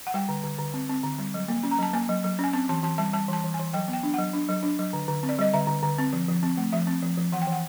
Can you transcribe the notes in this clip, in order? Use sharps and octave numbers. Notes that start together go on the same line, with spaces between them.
F#5
G3 G5
D3
D3
D3
C4
C4
D3
G3
F#3
A#3
C#4
A#5
F#3 A5
A#3 G#5
F#3
F#3
C#4 G#5
C4 A5
E3 A5
E3 A5
G3 A5
G3 A5
E3 A5
E3
E3 G#5
F#3 G5
B3
G5
D4
F#3 F#5
D4
F#3
D4
F#3
D3
D3
C4
D5
G3 D#5
D3 E5
D3
D3
C4
F3
F3
C4
A3
F3 E5
C4
F3
F3
E3 F#5
G5
E3
F#5